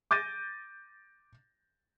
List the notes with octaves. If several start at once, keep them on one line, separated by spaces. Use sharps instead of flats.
D6 G6 A6 A#6 D#7